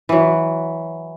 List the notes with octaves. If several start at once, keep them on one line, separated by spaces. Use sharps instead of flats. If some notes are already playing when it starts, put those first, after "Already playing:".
E3 F#3